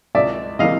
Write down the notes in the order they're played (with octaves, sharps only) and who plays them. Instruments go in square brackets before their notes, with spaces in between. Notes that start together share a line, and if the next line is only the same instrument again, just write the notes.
[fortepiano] C#2 D5 E5
C3 E3 G3 A#3 D#5 F5